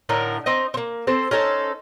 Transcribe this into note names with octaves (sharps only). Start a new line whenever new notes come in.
A2 D3 D#4 A#4
C4 D#4 D#5
A#3 C4
C4 A4 C5
C#4 D#4 A4 C5